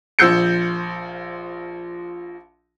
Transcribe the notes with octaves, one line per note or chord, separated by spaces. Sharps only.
A#1 F3 E6 G6 C#7